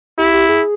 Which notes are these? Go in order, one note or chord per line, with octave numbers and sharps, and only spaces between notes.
E4 G4
G4
G#4